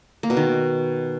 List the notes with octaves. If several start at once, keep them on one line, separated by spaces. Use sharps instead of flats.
A#3
B2
D#3